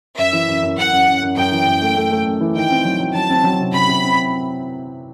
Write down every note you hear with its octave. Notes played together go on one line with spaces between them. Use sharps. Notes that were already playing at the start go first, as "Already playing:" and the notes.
F#2 E5
E3
F#2
F#2
F#2 F#5
F#2
F#2
F#2
F#2 G5
E3
F#2
A3
A3
A3
F#2
E3
D#3 G5
C4
F#3
F#3
F#3 A5
C4
F#3
C3
C3 B5
C3
C4